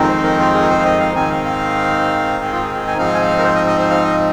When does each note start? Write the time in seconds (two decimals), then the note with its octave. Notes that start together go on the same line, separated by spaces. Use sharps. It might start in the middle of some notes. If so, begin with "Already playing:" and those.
Already playing: F2 D#3 G#3 C4 D#4
0.09 C5
0.23 A#4
0.39 F4
0.54 G#4
0.62 A#4
0.70 C5
0.79 F5
0.85 D#5
1.00 F5
1.15 G#2 D#3 C4 D#4 G#5
1.30 F5
1.45 F5
2.44 G#4
2.53 F4
2.64 G#4
2.75 G#4
2.87 G#5
2.98 G#2 F3 C4 D#4 F5
3.14 G#5
3.21 F5
3.39 A#4
3.44 C5
3.55 D#5
3.67 D#5
3.79 C5
3.90 F5
4.04 D#5